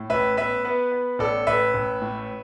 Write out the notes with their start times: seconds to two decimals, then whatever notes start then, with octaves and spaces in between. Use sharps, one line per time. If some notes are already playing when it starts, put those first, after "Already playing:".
Already playing: A2
0.10 A1 B4 E5
0.37 B3 B4 E5
0.65 B3 B4
0.92 B3
1.19 A1 A4 D5
1.47 A1 B4 E5
1.74 A1
2.02 A2